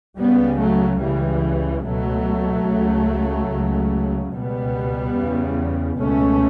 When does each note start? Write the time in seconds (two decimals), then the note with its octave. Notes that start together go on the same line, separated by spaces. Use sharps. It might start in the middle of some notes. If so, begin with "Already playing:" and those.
0.18 C#2 C#3 G3 B3
0.60 F#3 A3
1.01 C#2 C#3 E3 G3
1.84 C#2 B2 F#3 A3
2.67 C#2
2.72 C#3
3.50 C#2 C#3
4.33 C#2 B2 G3 B3
5.16 E2 C#3
5.99 C#2 B2 A3 C#4